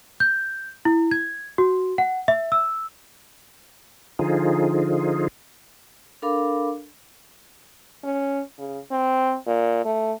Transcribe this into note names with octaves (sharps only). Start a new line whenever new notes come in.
G6
E4
G#6
F#4
F#5
E5
E6
D3 F3 D#4 F4 G#4
D4 A4 A#4 F5 B5 D6
C#4
C#3
C4
A#2
A3